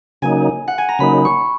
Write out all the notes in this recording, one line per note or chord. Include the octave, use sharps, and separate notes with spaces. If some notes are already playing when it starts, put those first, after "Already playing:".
C#3 F#3 A#3 D#4 G#5
F#5
G#5
A#5
C#3 F#3 A#3 D#4 B5
C#6